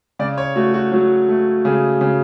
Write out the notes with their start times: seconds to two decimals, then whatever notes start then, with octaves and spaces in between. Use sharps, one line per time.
0.19 C#3 D5
0.38 C#5
0.56 A3 F#4
0.74 F#4
0.92 F#3
1.29 A3
1.65 C#3 G#4
2.01 C#3